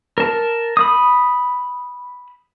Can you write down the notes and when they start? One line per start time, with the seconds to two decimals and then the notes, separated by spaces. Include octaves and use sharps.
0.18 A#4 A5
0.77 B5 D#6